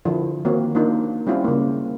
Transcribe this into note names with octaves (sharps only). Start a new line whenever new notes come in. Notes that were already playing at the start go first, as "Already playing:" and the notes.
D3 F3 E4
D#3 A#3 C4 F#4 C#5
A#3 D4 D#4 F4
G3 C4 C#4 E4 F4
C#3 A#3